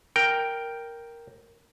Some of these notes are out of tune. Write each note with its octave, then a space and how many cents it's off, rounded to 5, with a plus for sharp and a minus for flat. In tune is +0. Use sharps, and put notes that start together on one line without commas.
A#4 +0 G5 +0